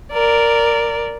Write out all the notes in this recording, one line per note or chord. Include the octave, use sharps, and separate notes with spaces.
A#4 D5